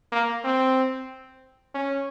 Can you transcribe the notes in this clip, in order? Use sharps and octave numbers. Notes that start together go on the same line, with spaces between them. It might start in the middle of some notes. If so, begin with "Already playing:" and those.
A#3
C4
C#4